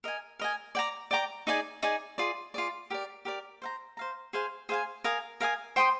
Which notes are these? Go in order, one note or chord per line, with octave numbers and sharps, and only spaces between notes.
A#4 D#5 G#5
A#4 D#5 G#5
D5 G5 A#5 D6
D5 G5 A#5 D6
D#4 G#4 D5 G#5
D#4 G#4 D5 G#5
F4 G#4 D5
F4 G#4 D5
G4 A#4 D5
G4 A#4 D5
C5 F5 A#5
C5 F5 A#5
G#4 C5 F5 G#5
G#4 C5 F5 G#5
A#4 F5 G#5 D#6
A#4 F5 G#5 D#6
C5 G5 C6 D#6